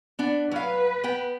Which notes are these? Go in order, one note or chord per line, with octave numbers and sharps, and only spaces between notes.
B3 D4
F#3 B4 F5
B3 G5